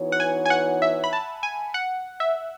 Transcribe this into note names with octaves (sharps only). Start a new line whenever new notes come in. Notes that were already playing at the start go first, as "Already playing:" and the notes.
Already playing: E3 B3 D#4 F#4 C#5
F#5
G#5
G#5
F#5
E5
B5
A5
G#5
F#5
E5